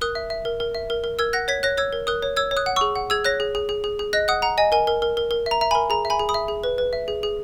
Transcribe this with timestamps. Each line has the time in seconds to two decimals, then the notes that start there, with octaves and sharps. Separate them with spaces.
0.01 A#4 D#6 F#6
0.15 E5
0.30 E5
0.45 A#4
0.60 A#4
0.75 E5
0.90 A#4
1.04 A#4
1.19 A#4 E6 G#6
1.33 F#5 F#6 A#6
1.48 C#5 G#6 B6
1.63 C#5 F#6 A#6
1.77 C#5 E6 G#6
1.93 A#4
2.07 A#4 D#6 F#6
2.23 C#5
2.36 C#5 E6 G#6
2.51 C#5
2.57 D#6 F#6
2.66 F#5
2.76 G#4 C#6 E6
2.95 F#5
3.10 G#4 E6 G#6
3.25 C#5 F#6 A#6
3.40 G#4
3.55 G#4
3.69 G#4
3.84 G#4
3.99 G#4
4.13 D#5 F#6 A#6
4.28 F#5 D#6 F#6
4.42 F#5 A#5
4.58 D#5 G#5
4.72 A#4 G#5
4.87 A#4
5.02 A#4
5.17 A#4
5.31 A#4
5.46 E5 A#5
5.61 E5 A#5
5.71 A#4 G#5 B5
5.90 G#4 A#5
6.05 E5
6.10 G#5 B5
6.19 G#4
6.29 B5 D#6
6.34 E5
6.48 G#4
6.64 B4
6.78 B4
6.93 E5
7.08 G#4
7.23 G#4